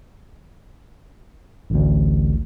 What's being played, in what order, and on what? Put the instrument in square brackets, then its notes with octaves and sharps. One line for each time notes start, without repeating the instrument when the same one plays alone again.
[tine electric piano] A1 D2